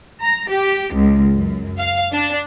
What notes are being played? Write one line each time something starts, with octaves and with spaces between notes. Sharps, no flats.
A#5
G4
C#2
F#2
F5
D4